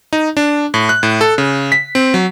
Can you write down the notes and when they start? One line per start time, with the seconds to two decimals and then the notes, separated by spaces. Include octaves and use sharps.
0.13 D#4
0.37 D4
0.74 A2
0.89 F#6
1.03 A2
1.21 A4
1.38 C#3
1.72 B6
1.95 C4
2.14 F#3